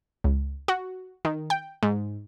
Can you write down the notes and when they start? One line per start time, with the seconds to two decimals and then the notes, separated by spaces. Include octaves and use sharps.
0.24 C#2
0.68 F#4
1.25 D#3
1.50 G5
1.83 G#2